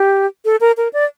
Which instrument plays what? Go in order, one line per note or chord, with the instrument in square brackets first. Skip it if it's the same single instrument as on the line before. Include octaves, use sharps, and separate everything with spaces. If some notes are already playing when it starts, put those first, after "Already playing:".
Already playing: [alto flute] G4
A4
A#4
A#4
D5